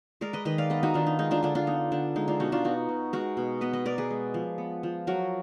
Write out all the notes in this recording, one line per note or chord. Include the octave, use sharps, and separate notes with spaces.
G#3 A#4 D5
B4 D#5
D#3 B4 D#5
D5 F5
B3 B4 D#5
D#4 F#4
D#3 D4 F4
D#4
G#3 D#4
D4 F4
D3 D4 F4
D4 F4
B3 D#4
D3 D4
G#3 D#4
D4 F4
B2 D#4 F#4
D4 F4
B3 D#4 F#4
B2
G#3 F#4 A#4
B2
B3 B4 D#5
B4 D#5
B2 A#4 D5
G#4 B4
G#3
F3
B3
F3
F#3 F#4 A#4